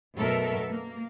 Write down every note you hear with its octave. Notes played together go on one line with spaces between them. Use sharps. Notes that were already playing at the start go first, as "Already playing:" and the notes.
F#2 B2 A3 A4 A#4 E5
A#3